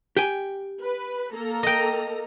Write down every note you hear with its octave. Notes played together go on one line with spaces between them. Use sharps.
G4 G5 G#5
B4
A#3 A4 A#5
D#5 G5